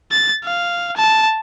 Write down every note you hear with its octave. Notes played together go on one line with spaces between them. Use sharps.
A6
F5
A5